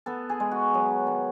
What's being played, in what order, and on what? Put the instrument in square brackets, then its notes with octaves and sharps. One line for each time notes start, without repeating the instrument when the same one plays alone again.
[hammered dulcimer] B3 A4
G#4
G#3
F#4
F#3
D#3